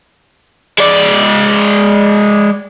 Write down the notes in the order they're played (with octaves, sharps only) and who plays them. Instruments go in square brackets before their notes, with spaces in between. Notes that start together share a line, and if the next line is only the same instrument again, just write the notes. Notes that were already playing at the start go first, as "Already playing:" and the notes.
[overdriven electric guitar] G#3 D5